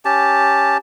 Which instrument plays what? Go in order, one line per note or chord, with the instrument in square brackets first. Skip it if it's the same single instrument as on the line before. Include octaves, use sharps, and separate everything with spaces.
[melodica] C#4 G4 A5